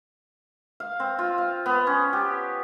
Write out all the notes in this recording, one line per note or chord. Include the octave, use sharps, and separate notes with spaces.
F5
C4
F4
F5
B3
C#4
G4